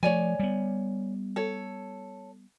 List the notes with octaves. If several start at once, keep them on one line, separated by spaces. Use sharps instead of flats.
F3 A3 C#5 D5 G#5
G3 B3
A4 C#5